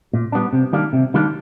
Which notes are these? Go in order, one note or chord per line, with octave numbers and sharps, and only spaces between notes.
A#2
G3 B3 D4
C3
D#3 G3 A#3 D4
C3
D#3 G3 A#3 D4